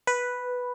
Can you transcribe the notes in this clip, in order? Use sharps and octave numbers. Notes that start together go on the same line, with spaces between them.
B4